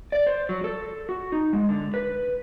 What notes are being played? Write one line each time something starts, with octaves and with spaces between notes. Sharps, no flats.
D5
C5
F#3
A4
F#4
D#4
G#3
D3
B4